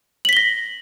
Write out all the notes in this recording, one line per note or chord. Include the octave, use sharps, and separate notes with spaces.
A#6 B6 F#7 G7